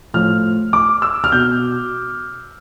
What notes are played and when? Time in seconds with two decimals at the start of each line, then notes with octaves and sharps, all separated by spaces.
0.14 A2 F3 F6
0.73 D6
1.02 E6
1.24 F6
1.32 B2 G6